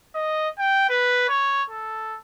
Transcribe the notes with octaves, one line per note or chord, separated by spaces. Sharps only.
D#5
G5
B4
C#5
A4